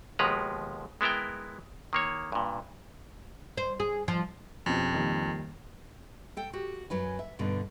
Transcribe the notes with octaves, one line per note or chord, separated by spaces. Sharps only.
D#2 B2 F3 G#3 B4 A#5
G#3 B3 E4 A#4 G5
D#3 A#3 C#5
G2 A#2
C5
G#4
F3
F2 B2 C#4 G4
D#3 G3 A#3
A4 G5
F#4 G4
F#2 F#3 B4 G#5
E5
G2 B2 D3